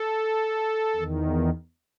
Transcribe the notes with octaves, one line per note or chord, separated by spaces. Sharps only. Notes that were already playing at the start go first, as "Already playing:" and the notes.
Already playing: A4
E2 D#3